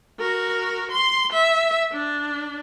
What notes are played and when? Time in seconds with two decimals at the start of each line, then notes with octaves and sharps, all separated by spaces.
0.19 F#4 A#4
0.91 C6
1.33 E5
1.92 D4